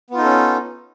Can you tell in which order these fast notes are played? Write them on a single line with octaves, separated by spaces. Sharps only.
B3 F4 D#4 A4 C#4